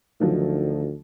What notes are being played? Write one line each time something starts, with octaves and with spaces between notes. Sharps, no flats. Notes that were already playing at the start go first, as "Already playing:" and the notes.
D2 D#3 F3 F#3